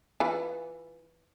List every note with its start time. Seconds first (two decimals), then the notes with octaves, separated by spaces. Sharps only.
0.20 E3 F4 B4